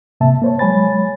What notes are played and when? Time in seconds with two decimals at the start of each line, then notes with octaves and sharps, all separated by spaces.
0.21 G#2 C3 A#3 E5 A5
0.42 A#3 C5 C#5
0.59 F#3 G#3 C#5 G#5 B5 A6